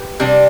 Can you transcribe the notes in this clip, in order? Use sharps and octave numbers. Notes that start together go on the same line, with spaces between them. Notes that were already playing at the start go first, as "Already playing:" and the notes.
Already playing: G4 B4
C3 G3 D4